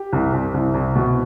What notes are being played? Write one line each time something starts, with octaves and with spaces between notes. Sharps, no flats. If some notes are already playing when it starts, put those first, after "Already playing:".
Already playing: G4
C2
C2
C2
C2
B2